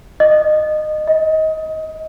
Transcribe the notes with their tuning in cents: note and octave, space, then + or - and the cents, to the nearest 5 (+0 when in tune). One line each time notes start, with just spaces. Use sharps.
D#5 -20
D#5 +20